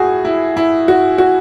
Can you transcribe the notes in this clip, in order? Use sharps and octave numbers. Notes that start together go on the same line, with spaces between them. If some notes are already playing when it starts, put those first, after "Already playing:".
Already playing: A2 F#4 G#4
E4
E4
F#4
F#4